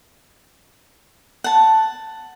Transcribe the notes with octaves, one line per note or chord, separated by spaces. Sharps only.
F#5 A5